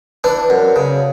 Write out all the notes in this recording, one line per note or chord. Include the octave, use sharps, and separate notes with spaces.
E3 D4
F#2
C#3